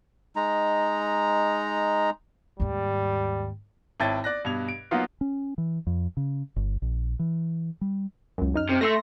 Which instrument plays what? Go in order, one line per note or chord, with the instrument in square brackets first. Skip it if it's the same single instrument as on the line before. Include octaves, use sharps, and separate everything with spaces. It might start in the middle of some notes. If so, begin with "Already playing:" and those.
[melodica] G#3 D#4 A#5
[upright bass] D#2 G#2 [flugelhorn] G3
[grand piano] G#1 E4 C#5 G5 A5 A6
D5 F#6 A#6
G2 B2 G#6 F7
D7
F#3 A#3 B3 D#4 F4 F#4
[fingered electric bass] C#4
E3
F2
C#3
G1
A#1
E3
G3
[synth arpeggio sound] C#2 F#2
F#2 D#4 F6
[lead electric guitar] C3
[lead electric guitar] A3 [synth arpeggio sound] E5 C6 A#6